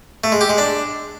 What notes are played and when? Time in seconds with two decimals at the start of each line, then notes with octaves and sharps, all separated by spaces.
0.24 A3
0.32 G#3
0.41 G4
0.49 G#3
0.58 D4